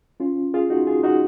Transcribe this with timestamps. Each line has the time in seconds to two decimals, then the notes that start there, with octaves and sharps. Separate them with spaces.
0.20 C#4 F4
0.54 F4 G#4
0.70 D#4 F#4
0.87 F4 G#4
1.03 D#4 F#4